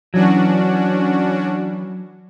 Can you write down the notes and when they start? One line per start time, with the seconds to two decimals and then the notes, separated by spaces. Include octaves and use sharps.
0.14 E3 F#3 C#4 D4 F#4